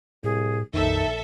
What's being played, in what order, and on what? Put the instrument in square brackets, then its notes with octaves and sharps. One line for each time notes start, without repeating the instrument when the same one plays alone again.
[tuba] C2 [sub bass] A2 [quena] G#4
[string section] A#1 A4 E5 [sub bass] F2 [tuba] D#3 [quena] D#4